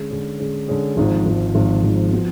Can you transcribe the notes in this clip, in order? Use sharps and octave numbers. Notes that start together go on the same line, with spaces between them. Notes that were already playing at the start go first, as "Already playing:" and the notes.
Already playing: D3 G#3 C#4 G#4
D3 G#3 C#4 G#4
D3 G#3 C#4 G#4
D3 G#3 C#4 G#4
G#1 G#2 F3
G#1 G#2 F3
G#1 G#2 F3
G#1 G#2 F3
F3 B3 F#4